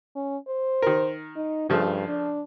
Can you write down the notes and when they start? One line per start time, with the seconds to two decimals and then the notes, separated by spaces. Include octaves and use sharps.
0.16 C#4
0.48 C5
0.82 D#3 A#4
1.36 D#4
1.70 G2 C#3 F3 A3
2.08 D4